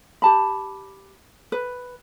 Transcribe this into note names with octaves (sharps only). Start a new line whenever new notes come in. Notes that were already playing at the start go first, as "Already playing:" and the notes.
G4 A5 B5
B4